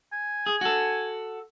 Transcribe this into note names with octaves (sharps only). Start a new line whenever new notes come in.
G#5
G#4
F#4 A4